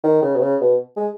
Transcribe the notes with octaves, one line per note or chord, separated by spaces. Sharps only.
D#3
C#3
B2
C#3
B2
G#3